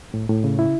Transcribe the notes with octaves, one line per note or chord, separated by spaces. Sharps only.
A2
A2
C#3
E4